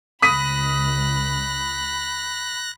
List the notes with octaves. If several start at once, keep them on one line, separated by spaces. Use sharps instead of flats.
C#2 B5 D#6 F#6 A#6 B6 D#7